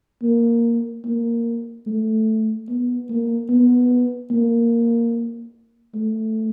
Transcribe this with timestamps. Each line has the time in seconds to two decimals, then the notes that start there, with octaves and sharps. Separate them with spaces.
0.23 A#3
1.05 A#3
1.87 A3
2.69 B3
3.10 A#3
3.49 B3
4.31 A#3
5.94 A3